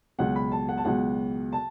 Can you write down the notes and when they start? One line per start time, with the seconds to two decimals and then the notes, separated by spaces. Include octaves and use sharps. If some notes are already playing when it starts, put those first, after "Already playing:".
0.18 C#2 B2 F#3 F#5
0.36 B5
0.52 A5
0.69 F#5
0.77 A5
0.85 C#2 B2 F#3 F#5
1.52 A5